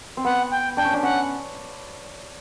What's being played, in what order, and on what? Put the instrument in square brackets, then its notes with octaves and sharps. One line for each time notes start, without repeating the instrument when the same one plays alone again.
[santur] C4
[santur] B3 [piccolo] F#5
[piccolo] G5
[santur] D4 [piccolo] G5
[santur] C#4
D4
[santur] C#4 [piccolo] F#5